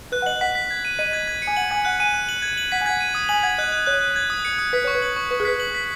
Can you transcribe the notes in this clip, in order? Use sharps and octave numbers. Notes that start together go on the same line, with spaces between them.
B4 F#6
F#5
D#5 F#7
F#5 B6
B6
G#6
D#7
D#5 D#7
G#6
G#6
C#7
G#5
F#5 F#7
G#5 G#6
F#5 F#6
G#5 D#7
F#6
F#7
G#6
F#7
F#5 B6
G#5
F#5 G#6
D#7
D#6
G#5 F#7
F#5 G#6
D#5 F#6
F#6
C#5 F#6
F#6
G#6
D#6
C#7
D#6
B4 B6
C#5 C#6
B4
F#7
C#6
B4 C#6
G#4
B4 B6
F#7
B6